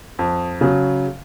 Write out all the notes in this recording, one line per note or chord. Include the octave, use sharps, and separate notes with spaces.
F2
C#3 F#3